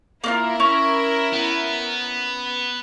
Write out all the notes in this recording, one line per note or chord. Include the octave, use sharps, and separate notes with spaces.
A#3 D4 E4 F4 A#4
C#4
B3